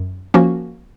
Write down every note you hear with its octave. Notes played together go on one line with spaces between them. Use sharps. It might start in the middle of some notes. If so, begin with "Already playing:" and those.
Already playing: F#2
F3 A#3 C#4 F#4